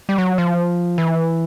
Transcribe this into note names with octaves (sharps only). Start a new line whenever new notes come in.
G3
F#3
F3
E3